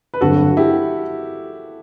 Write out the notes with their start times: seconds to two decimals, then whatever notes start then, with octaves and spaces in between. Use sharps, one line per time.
0.14 B4
0.21 G1 G2 F#3 C4 F#4 A4
0.57 E4 G4